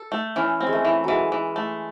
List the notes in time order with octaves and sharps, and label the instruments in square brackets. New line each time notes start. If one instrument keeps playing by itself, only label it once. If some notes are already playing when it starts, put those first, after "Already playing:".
Already playing: [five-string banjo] A4
A3
[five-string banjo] E3 [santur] C#4
[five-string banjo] C4
[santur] G#3
A3
[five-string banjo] E3
[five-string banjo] E3 [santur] F#3 G#3
[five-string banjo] E3
A3